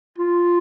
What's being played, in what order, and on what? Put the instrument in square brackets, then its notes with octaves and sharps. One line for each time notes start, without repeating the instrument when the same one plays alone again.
[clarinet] F4